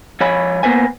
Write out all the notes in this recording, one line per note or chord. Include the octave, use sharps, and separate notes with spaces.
F3 C#5 G#5 B5
A#3 B3 B4 C5 G#5